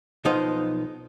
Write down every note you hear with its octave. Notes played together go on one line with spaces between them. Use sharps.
B1 F3 B3 D#4 C5 F5